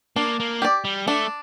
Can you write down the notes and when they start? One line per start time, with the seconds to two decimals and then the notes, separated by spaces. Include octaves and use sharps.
0.16 A#3 D4
0.40 A#3
0.62 G4 D5
0.85 G3
1.07 A3 D4